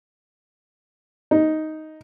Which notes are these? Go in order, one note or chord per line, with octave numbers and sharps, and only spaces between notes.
D#4